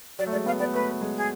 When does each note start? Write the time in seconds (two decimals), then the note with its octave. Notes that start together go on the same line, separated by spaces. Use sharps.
0.19 F#3 D5
0.26 A3
0.32 G#3 D5
0.46 B3 F5
0.60 B3 D5
0.73 A3 B4
1.01 G#3
1.17 G#4